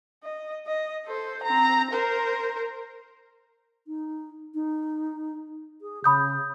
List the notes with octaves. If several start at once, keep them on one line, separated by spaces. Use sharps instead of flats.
D#5
D#5
A4 C5
C4 A#5
A#4 C5
D#4
D#4
G#4
C#3 B5 D#6 G6